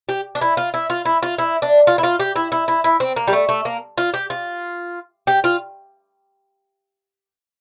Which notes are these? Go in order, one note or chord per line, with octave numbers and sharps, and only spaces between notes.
G4
D4
E4
F4
E4
F4
E4
F4
E4
D4
F4
E4
F4
G4
E4
E4
E4
E4
C4
A#3
G3
A3
A3
A#3
F4
G4
F4
G4
F4